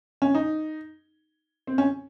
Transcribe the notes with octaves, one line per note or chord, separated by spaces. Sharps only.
C#4
D#4
C4
C#4